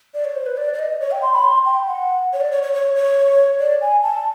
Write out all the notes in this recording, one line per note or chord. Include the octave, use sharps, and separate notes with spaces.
D5
C#5
C5
B4
D5
D5
D#5
C#5
G5
C6
B5
C6
G5
F#5
C#5
D5
C#5
C#5
C#5
C#5
D5
G#5
A5